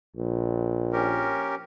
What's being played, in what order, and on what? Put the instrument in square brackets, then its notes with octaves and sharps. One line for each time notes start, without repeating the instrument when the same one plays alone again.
[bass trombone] A#1
[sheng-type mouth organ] C#4 G4 A#4